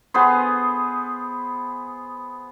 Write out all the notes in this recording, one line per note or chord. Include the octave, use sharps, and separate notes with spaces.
B3 G#4 C5